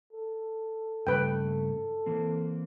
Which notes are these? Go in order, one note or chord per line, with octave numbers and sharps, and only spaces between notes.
A4
G2 C#3 A3 B4 G5
E3 A#3 C4